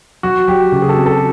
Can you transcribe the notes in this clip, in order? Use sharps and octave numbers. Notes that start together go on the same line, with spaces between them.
F#3 F#4
F#3 G4
C#3
G#4
A4
C4
A4